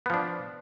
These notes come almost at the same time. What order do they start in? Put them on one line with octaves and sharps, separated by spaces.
B3 F3 D4